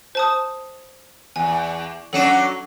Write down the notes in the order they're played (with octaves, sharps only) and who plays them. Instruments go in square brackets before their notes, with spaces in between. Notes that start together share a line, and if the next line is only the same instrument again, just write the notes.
[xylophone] C5 A5 D#6
[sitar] E2 [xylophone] G#5
[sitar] F#3 C#4 D4 [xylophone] A4 F#5 E7